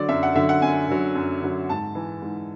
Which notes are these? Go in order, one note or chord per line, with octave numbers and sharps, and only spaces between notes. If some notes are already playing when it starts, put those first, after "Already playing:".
Already playing: D3 F#3 D5
F#2 E5
F#5
D3 F#3 E5
F#5
F#2 G#5
D3 F#3
F#2
D3 F#3
G#2 A5
E3
G#2